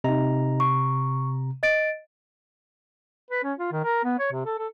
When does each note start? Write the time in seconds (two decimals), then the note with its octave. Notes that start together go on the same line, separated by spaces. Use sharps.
0.04 C3 D#4 D#5 A#5
0.60 C#6
1.63 D#5 A6 D7
3.30 B4
3.43 C#4
3.58 F4
3.72 D#3
3.84 A#4
4.04 B3
4.19 C#5
4.31 C3
4.45 A4
4.58 A4